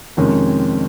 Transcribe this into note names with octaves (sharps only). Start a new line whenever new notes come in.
F2 C3 D#3 G#3 C#4